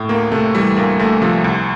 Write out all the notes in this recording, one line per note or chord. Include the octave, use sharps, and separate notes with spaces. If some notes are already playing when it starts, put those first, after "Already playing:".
Already playing: A2
D2 A#3
C3 A3
E3 G3
D2 A#3
D2 A3
C3 F3
C2